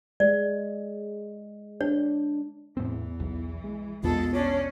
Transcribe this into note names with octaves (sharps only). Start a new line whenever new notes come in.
G#3 D5
D4 C#5
E2 A2 E3 C4
B1
G#3
A#1 E2 B2 G#3 B3 F4 A4
C#4 D4 C#5